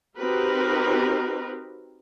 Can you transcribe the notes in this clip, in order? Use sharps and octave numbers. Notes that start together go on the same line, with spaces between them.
C4 D#4 F#4 G4 A#4 B4